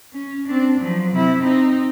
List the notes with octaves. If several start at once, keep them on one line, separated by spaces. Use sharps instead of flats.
C#4
C4 D4
F3 F#3
C3 E4
C4 D#4